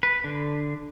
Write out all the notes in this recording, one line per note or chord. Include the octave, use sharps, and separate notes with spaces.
B4
D3